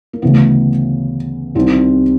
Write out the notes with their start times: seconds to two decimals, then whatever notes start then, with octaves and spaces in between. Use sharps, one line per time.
0.13 A#3
0.22 D2 C#3 E3 B3
1.55 C2 C3 D#3 C4